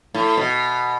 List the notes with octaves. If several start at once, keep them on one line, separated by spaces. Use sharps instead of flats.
A2
B2